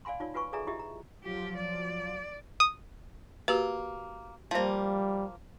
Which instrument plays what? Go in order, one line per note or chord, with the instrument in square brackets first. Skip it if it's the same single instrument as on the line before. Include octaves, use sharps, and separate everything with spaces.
[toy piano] D5 F5 G#5 B5 C6
D#4 F4 C#5 D5
F4 F#4 B4 G#5 B5 C#6
G#4 A4 D5 E5 G#5 A#5
E4 F4 G4 D#5 E5
A#5
[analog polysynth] F3 F#3 F4 [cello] G4
[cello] D5
[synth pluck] D#6
[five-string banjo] A#3 [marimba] F#4 G4 B4
[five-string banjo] F3 A#3 [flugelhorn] G3 [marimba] C5 A5